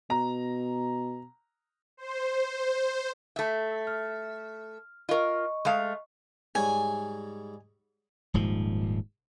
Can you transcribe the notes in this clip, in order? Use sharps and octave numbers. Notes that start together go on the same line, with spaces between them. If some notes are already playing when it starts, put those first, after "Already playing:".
B2 A#5
C5
A3 E5
F6
F4 A#4 D#5 C#6
G#3 A3 F5
G#2 G3 C#5 G#5
D#1 G#2 F3